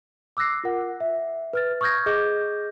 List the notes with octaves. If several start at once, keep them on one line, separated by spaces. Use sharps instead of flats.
D6 E6 F#6 A#6 C7
F4 A#4 F#5
E5
B4 F6 A6
C#6 D#6 F6 G6 G#6 A#6
G#4 D#5 D6 G6